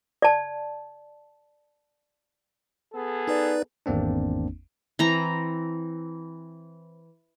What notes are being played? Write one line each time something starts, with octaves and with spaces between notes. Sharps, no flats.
D5 A5
B3 G#4 A4
D#4 B4 D5
G#1 E2 A#3 C4 D4
E3 C4 A#5